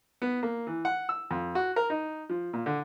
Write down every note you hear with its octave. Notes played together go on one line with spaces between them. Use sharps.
B3
A#3
E3
F#5
E6
F2
F#4
A#4
D#4
F3
A#2
D3